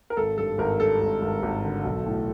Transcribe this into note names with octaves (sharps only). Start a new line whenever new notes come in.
A#4
G#1 A4
G2 A4
G#1 A#4
G2 A4
G#1
G#1
G#1
D3
B1
A2